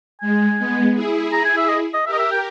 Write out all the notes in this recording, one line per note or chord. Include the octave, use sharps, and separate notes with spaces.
G#3 G#5
G#3 B3
E4 G#4
A#5
G#5
E5
D#5
D#5
G4 A#4 E5
D#5
E5
G5